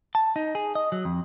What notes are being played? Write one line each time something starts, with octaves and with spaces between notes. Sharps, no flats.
A5
D#4
G#4
D#5
F#3
F2